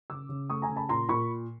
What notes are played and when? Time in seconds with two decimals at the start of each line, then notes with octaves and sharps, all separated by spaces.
0.10 C#3 D6 E6
0.29 C#3
0.50 A3 C#6 D#6
0.62 G#5 A#5
0.69 C#3
0.76 A5 B5
0.89 A#2 A#5 C6
1.09 A#2 B5 C#6